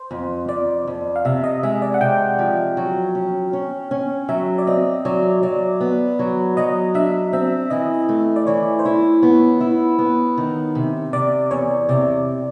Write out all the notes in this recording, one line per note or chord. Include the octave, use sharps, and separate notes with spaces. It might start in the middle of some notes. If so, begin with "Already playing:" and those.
Already playing: C5
F2
F2 D5
F2
F5
C3 E5
D#5
G#3 E5
D5
F#5
C3 G5
F3
F#3
C#4
C#4
C#4
F#3 E5
D5
C4 D#5
F#3 D5
F#3 D5
B3
F#3
F#3 D#5
D4 E5
C4 E5
E3 D#5
A3
D5
E3 C#5
C5
E4 C#5
B3
E4
B3
D#3
C3
C3 D5
E2 C#5
C3 D5